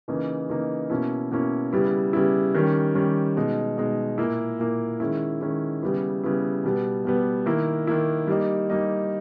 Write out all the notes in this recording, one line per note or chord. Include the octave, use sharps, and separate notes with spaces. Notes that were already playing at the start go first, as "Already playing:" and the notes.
C#3 E3 A#3 D#4
C#3 E3 A#3 D#4
B2 A#3 C#4 E4
B2 A#3 C#4 E4
C#3 G3 B3 E4
C#3 G3 B3 E4
D#3 G3 C#4
D#3 G3 C#4
B2 G#3 D#4
B2 G#3 D#4
A#2 A#3 E4
A#2 A#3 E4
D#3 G#3 C#4 E4
D#3 G#3 C#4 E4
C#3 G3 B3 E4
C#3 G3 B3 E4
B2 G3 B3
B2 G3 B3
D#3 A#3 E4
D#3 A#3 E4
G3 A#3 D#4
G3 A#3 D#4